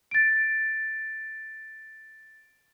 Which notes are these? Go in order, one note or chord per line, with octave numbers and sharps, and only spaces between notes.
A6 D7